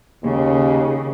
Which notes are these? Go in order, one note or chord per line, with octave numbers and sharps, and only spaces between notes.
D#2 C#3